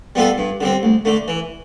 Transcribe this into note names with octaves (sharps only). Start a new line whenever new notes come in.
G3 B3 F4 A4
G2
D3 G3 C4
D2
D3 A3
E3